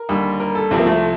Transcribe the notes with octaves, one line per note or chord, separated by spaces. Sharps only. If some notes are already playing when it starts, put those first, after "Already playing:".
Already playing: A#4
D#2 D3 G3
A#4
A4
C2 C3 F3 C4
A#3
A3